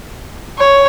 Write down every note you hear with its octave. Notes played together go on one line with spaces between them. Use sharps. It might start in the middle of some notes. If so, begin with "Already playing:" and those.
C#5